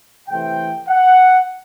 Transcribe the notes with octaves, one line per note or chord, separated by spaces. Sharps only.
C3 E3 A3 C4 G5
F#5